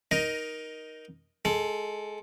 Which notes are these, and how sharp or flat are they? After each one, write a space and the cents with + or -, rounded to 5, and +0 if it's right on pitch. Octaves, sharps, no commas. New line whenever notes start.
D#4 +5 A#4 +15 D#5 +0
G#3 +15 A4 +0